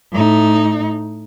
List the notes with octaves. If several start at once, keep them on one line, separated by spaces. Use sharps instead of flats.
A2 D#4